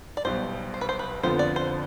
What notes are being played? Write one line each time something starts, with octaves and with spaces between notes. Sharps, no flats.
D5
B1 B2 G3 C5
C5
B4
C5
B4
F2 D3 F3 B3 F4 C5
D5
C5